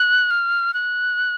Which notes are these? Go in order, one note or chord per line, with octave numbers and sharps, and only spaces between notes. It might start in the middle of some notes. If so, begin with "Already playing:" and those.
Already playing: F#6
F6
F#6